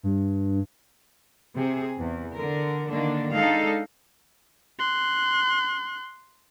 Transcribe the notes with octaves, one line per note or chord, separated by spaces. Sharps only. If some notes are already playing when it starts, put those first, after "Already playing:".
G2
C3 G#4
E2
D3 A#4
D3 D#3 A#3 D4
G#3 D4 D#4 A4 D#5 F5
C6 F#6